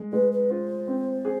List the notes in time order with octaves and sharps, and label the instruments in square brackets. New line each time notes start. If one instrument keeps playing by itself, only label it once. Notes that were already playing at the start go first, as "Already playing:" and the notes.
Already playing: [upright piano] G#3
[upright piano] G#3 [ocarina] B4
[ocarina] B4
[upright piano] F4 [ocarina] C5
[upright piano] C4
G#4